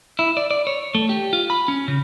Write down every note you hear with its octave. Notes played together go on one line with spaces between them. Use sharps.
E4
D5
D5
C#5
A3
G4
F4
B5
C#4
C#3